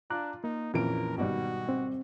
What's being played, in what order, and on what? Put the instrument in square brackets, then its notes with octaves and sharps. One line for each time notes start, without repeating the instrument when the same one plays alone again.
[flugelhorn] D4 [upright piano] F4 [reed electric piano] A#5 D6 F#6
[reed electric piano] A#3 [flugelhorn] D#4
[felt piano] A#1 A#2 E3 [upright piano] F2 C#4 D7 [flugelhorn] A#4
[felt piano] G#1 D#3 G3 [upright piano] B2 [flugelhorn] F#4
[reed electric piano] C4